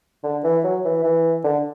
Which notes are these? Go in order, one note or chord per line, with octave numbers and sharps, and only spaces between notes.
D3
E3
F#3
E3
E3
D3